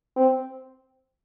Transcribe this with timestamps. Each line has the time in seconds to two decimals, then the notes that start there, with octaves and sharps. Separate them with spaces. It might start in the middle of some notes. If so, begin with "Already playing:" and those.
0.16 C4